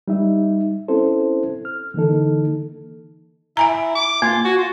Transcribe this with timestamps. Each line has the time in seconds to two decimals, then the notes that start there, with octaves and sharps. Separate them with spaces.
0.08 G3 D#4 E5
0.88 C4 C#4 E4 A4 C5
1.65 F6
1.94 D3 E3 A#3 D#4 A4
3.57 E4 E5 G#5 A#5
3.95 D6
4.22 A#3 F4
4.45 F#4
4.58 F4